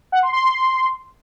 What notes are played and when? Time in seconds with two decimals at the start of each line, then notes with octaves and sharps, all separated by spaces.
0.12 F#5
0.23 C6
0.33 C6